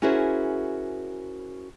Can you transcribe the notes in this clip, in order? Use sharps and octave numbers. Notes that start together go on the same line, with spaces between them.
C#4 E4 F#4 G#4 A#4 C5